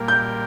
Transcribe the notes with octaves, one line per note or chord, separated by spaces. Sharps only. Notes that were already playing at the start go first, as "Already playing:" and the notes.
Already playing: A#2 G3 A#3
G6